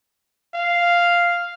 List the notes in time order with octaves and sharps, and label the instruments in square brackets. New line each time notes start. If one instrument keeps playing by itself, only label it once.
[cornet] F5